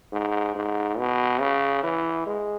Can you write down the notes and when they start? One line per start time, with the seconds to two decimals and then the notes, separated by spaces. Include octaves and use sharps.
0.12 G#2
0.55 G#2
0.98 B2
1.40 C#3
1.83 E3
2.26 G#3